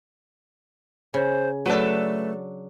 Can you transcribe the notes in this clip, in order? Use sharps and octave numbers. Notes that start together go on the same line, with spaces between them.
C#3 C5
F#3 A3 D4 A4 B4